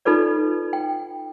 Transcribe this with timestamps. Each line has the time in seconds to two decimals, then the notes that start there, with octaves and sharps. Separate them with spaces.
0.05 D#4 F4 A4 B4 D5
0.73 G5